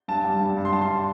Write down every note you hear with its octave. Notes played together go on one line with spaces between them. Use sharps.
G2 A5
G3
G2
G2
C6
G3 A5
C6